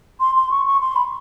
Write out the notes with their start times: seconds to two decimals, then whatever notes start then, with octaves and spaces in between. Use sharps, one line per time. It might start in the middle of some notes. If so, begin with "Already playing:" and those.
0.20 C6
0.35 C6
0.51 C#6
0.66 C#6
0.80 C6
0.95 B5